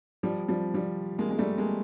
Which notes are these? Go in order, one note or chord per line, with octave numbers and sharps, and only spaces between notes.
F3 G3
F3 G3
F3 G3
G#3 A#3
G#3
G3 A3
G#3 A#3